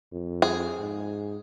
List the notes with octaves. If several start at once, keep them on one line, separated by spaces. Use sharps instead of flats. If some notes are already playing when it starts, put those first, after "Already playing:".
F2
G#4
G#2